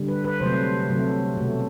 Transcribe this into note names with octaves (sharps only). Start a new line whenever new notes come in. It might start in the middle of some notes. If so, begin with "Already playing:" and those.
Already playing: D3 G3
B4
B4
C3 F#3 A3 C5
C3 F#3 A3
B2 A3